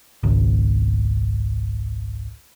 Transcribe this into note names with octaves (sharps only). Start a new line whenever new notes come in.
G#1 C#2